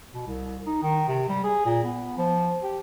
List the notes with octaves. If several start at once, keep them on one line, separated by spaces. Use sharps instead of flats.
B2
C2
D#4
D#3
C3
G3
G#4
A#2
B3
F3
G4